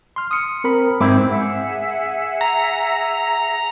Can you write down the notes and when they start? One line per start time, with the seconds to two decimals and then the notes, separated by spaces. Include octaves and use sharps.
0.16 C6 F6
0.31 D#6 C#7
0.64 C4 A#4 B5
1.01 G#2 C4 E4 D6
1.28 G#4 E5 F#5
2.41 A#5